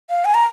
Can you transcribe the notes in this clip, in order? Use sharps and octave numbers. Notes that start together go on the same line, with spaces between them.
F5
G#5
A#5